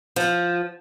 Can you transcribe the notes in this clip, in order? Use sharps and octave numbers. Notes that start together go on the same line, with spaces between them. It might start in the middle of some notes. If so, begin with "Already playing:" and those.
F3